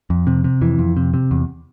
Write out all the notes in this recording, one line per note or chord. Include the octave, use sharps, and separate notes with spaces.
F2
C3
C3
F2 E3
F2
C3
C3
E2